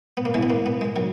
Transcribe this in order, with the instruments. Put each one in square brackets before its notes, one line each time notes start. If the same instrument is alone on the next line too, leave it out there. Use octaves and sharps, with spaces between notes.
[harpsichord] B3
A#3
E2 C#3 E3 G#3
B3
A#3
B3
G#3
D#3 F#3